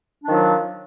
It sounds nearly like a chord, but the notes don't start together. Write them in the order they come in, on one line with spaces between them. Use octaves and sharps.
D4 D#3 F3 F#3